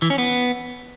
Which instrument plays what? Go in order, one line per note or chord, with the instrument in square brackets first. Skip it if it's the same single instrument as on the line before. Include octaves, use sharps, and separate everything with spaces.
[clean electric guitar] E3
C#4
B3